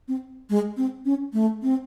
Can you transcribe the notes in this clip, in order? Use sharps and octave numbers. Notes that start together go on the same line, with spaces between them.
C4
G#3
C4
C#4
A3
C4